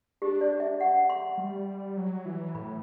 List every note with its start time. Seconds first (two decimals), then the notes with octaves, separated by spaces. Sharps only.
0.22 D4 G4
0.41 D5
0.60 E5
0.81 F#5
1.09 C6
1.38 G3
1.97 F#3
2.25 E3
2.55 A2 B5